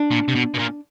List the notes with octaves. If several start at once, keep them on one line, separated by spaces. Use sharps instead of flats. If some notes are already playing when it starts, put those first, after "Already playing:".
Already playing: D4
A#2
C3
B2
B2
A#2